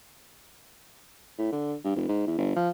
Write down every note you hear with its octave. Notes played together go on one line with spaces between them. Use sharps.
A2
D3
G2
F1
G#2
E2
G1
F3